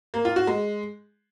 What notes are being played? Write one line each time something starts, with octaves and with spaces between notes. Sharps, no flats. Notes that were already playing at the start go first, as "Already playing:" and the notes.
A#3
F4
F#4
G#3